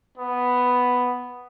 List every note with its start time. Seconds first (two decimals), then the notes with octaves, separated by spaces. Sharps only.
0.18 B3